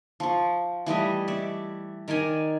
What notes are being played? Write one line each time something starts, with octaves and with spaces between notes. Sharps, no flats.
F3 C#6
E3 G3 A3 D#5
D5 E5 C#6
D#3 A#4 D5 G#5